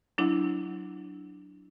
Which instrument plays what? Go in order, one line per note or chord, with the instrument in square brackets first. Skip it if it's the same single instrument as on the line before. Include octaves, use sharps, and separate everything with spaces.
[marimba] F#3 D4 E4